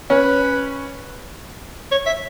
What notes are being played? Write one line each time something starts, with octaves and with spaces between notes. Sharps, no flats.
C#4 B4
C#5
E5